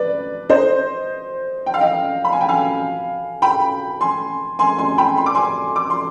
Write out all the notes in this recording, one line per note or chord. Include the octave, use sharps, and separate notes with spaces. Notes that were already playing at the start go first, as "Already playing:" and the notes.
Already playing: B4 D5
C5 D#5
G5
F5
D#5 G5
B5
G#5
G5
F5 G#5
G5 B5
G#5 C6
G#5 C6
G#5 C6
G5 B5
C6
D6
G#5 C6
D6
C6